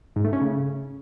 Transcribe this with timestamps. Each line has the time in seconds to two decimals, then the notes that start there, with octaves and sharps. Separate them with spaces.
0.16 G#2
0.24 A3
0.33 C#4
0.41 C#3